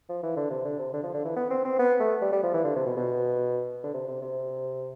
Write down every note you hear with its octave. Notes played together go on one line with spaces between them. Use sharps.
F3
E3
D3
C3
D3
C3
D3
F3
D3
E3
B3
C4
C4
B3
A3
G3
G3
F3
E3
D3
C3
B2
B2
D3
C3
C3
C3